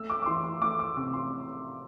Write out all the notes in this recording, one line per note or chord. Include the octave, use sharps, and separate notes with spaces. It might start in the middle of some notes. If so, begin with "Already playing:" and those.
Already playing: A3 E6
D6
D6
E3 C6
C6
A3 D6
E6
C3 D6
C6